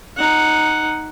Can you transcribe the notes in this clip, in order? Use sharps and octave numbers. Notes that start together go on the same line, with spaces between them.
D#4 F#5